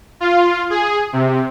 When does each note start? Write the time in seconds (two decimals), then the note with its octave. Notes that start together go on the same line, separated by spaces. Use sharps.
0.20 F4
0.70 G#4
1.13 C3